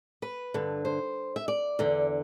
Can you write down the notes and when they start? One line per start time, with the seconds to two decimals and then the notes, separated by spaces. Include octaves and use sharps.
0.22 B4
0.54 G2 D3
0.85 C5
1.36 E5
1.48 D5
1.79 E2 D3